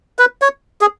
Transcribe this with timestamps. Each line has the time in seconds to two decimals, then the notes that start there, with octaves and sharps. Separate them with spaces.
0.19 B4
0.42 C#5
0.81 G#4